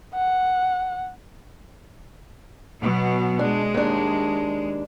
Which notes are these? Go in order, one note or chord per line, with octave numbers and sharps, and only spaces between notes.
F#5
B2 F#3 B3
G#3 D4
D#2 D4